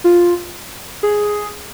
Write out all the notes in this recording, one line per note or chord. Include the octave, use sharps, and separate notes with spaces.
F4
G#4